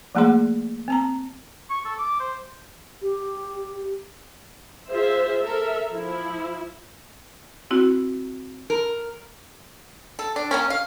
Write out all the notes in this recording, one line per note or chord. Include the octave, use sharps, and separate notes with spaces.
F3 A3 A#3 G#4 C6
C4 A5 A#5
C#6
A4
D6
C5
G4
F4 G#4 C5 E5
A4 A#4 E5
F3 E4
C4 E4 F#4
A#4
A4
D4
C3 A#3 C#4
F5